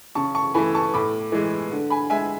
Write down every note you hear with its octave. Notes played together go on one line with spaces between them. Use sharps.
C#3 A5 C#6
A5 C#6
E3 A3 G#5 B5
A5 C#6
A2 B5 D6
E3 G#3
D3
G#5 B5
G#3 E5 G#5